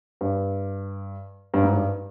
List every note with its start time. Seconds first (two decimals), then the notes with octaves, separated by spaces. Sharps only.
0.21 G2
1.54 G2
1.63 G#2
1.73 G2